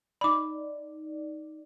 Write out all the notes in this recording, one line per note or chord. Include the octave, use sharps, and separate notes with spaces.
D#4 D5 B5 D6